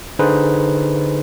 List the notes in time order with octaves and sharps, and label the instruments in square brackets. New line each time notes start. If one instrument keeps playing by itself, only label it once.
[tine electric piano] D3 D#4 G#4 B4 C5